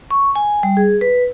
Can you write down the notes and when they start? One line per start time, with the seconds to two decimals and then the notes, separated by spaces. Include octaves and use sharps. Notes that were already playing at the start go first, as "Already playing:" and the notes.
0.11 C#6
0.35 G#5
0.63 G3
0.77 G#4
1.01 B4